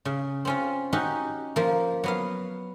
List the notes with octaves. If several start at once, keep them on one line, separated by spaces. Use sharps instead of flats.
C#3
C4 C#4 F4
C#4 D#4 F#4 G4
F3 A#3
F#3 B3 F5